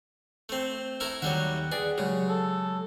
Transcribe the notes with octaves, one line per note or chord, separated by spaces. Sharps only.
A3 C4
A3 E4 A#4
D#2 D#3 F#3 G3 E5 F#5
G#4 B4 D5 G5
C#3 F#3 G#3 G4
A4